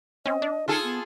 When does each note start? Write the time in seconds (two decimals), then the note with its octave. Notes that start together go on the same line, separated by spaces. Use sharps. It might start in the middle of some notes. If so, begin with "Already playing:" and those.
0.26 C4 C#4 D#5
0.42 D4
0.68 D#4 F4 G#4 A4
0.84 B3